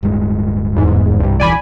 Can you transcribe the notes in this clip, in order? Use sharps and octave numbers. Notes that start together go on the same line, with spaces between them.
D1 G2 G#3
E2 G#2
C2 G2 G3
D#1 G#2 E3 D5 G#5 B5